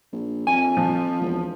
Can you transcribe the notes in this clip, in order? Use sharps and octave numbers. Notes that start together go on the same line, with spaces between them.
A#1
F2 G#5
F3
E1